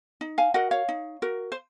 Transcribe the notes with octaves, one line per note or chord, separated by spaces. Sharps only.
D#4
F5 G#5
F#4 A#4 D#5 F#5
C#5 F5
D#4
F#4 A#4
C5